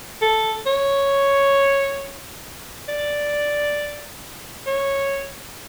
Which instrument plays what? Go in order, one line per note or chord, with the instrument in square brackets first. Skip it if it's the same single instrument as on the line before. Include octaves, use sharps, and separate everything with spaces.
[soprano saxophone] A4
C#5
D5
C#5